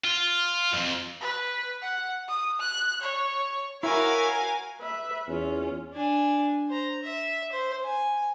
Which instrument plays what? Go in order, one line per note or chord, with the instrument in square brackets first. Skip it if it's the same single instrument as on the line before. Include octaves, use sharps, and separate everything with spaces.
[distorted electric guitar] F4
F2
[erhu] B4
F#5
D#6
F#6
C#5
[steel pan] E4 [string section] F#4 A#4 [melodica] C#5 B5 E6 [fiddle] F5 G#5
[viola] B4 E5
[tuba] E2 [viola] C#4 F4
[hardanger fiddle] D4 G#5
C5 A#5
E5
C5
G#5